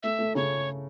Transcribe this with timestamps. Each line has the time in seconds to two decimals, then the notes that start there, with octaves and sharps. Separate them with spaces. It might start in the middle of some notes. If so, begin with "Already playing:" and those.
0.03 A3 E5
0.19 A3
0.35 C#3 C#5